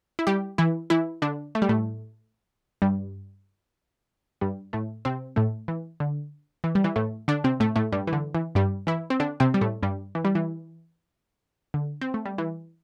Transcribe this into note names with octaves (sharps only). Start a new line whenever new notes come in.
E4
G3 G4
E3 E4
E3 E4
D3 D4
A3
G3
A2 A3
G2 G3
G2 G3
A2 A3
C3 C4
A2 A3
E3
D3
E3
G3
E3
A2 A3
D3 D4
C3 C4
A2 A3
A2 A3
G2 G3
E3
D3
E3
G2 G3
E3 E4
C4
D3 D4
C3 C4
G3
A2 A3
G2 G3
E3
G3
E3
D3
C4
A3
G3
E3